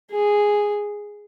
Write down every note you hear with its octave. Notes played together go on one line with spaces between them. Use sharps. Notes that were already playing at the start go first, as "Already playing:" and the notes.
G#4